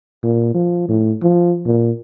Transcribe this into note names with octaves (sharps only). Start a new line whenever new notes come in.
A#2
F3
A2
F3
A#2